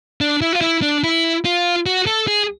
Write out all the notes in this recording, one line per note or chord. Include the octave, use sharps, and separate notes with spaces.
D4
E4
F4
E4
D4
E4
F4
F#4
A4
G#4